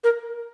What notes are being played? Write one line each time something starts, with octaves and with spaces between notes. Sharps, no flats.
A#4